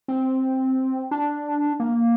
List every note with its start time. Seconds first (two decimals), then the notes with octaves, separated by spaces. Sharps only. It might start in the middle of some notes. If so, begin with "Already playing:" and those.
0.08 C4
1.11 D4
1.80 A#3